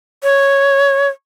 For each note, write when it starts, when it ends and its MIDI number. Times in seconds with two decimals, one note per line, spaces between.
0.23 1.08 73